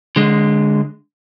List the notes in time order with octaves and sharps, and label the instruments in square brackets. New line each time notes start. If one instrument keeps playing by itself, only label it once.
[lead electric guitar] D3 G#3